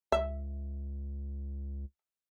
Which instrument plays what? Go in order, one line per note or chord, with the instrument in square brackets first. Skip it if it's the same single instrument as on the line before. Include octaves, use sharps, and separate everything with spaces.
[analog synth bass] C#2 [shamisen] E5